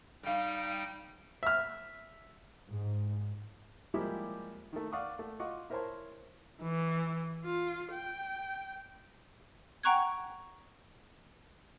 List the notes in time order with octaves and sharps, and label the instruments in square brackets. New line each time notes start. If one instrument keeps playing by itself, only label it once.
[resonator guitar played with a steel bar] G2 F5 [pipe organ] G3 D#4 G5
[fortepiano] E5 F6
[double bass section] G#2
[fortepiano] F3 G3 G#3 A#3 E4 G4
D#3 A3
D5 F5 F#5 C#6 D#6
A3
F4 D#5 F#5 C#6 D6
E4 A#4 C5 C#5 A5 C6
[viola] E3
F4
G5
[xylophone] F#5 G5 A#5 C#6 F#6 G#6